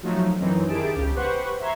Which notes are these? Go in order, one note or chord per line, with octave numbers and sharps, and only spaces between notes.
F3 F#3 A3 D#4
F#2 E3 F#3 C4 D#4
D#3 E4 G4 G#4 A5 D7
G1 C#2 C#3 G4
G4 B4 C5 F#5 C#6
E5 A#5 C6 C#6 G#6